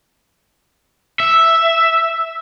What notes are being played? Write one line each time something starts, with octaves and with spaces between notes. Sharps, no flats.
E5